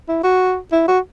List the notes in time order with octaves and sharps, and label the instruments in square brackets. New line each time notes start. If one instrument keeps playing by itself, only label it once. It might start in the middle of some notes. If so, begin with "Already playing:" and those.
[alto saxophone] E4
F#4
E4
F#4